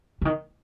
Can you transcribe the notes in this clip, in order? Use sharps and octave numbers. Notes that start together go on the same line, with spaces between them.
D3
D#3